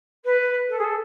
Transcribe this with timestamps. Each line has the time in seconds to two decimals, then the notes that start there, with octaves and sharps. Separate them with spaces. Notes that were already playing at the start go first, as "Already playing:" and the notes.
0.24 B4
0.69 A4
0.78 G#4
0.84 A4